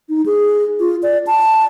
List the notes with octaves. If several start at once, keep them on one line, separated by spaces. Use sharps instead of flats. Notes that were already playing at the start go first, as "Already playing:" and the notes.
D#4
G#4
F4
D5
A5